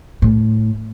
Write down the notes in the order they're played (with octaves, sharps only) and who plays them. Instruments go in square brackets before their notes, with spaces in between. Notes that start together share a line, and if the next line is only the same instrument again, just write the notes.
[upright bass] A2